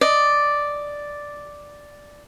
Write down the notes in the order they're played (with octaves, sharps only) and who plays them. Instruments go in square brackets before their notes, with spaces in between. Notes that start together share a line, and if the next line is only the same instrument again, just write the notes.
[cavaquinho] D5 D#5